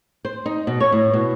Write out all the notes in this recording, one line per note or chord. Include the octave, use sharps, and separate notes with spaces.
C5
D#4
B2
C#5
A2
B2